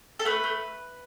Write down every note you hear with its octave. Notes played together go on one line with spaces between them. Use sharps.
A4
A3 B4
A3